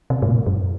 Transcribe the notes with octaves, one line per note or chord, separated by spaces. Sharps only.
C3
G#2
A#2
F#2